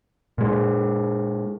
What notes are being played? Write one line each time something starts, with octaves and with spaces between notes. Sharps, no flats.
A#2 G#3